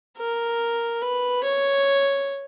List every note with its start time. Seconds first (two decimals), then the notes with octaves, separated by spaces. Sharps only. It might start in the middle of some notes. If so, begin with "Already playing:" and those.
0.18 A#4
1.02 B4
1.43 C#5